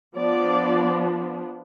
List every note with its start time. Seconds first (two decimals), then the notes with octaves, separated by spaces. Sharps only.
0.17 F3 B3 D4 D5